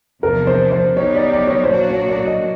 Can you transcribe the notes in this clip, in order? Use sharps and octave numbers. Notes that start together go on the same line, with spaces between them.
E2 C3 F3 A#3 D4 A#4
C5
C5
F#3 B3 D#4 G4 C#5
D5
D5
C#5
D5
C5
A#2 F#3 A#3 D4 F#4 C#5
C#5
D5
D#5